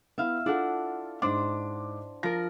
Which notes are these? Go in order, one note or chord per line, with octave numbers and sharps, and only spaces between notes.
B3 E4 E5 F5
D4 E4 F4 A4 F#5
G#2 D4 C5 D6
F3 A#4 A#6